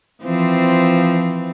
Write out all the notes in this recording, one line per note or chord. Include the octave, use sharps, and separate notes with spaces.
E3 F3 C4